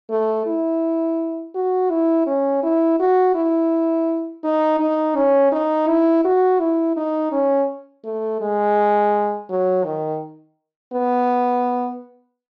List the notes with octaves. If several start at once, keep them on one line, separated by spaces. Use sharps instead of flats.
A3
E4
F#4
E4
C#4
E4
F#4
E4
D#4
D#4
C#4
D#4
E4
F#4
E4
D#4
C#4
A3
G#3
F#3
D#3
B3